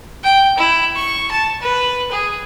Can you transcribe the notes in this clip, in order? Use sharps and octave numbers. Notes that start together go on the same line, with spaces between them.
G5
E4
C#6
A5
B4
G#4